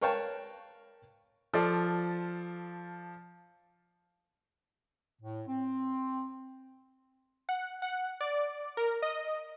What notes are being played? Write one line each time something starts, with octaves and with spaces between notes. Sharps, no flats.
A#4 B4 C#5 F5 G5 A5
F3 F4 A4 D5
A2
C4
F#5
F#5
D5
A#4
D#5